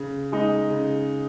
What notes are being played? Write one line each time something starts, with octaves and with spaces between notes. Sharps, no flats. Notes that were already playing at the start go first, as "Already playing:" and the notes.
Already playing: C#3
G#3 D#4
C#3